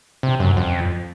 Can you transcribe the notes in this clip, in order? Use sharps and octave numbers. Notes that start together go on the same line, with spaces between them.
C3
F#2
F2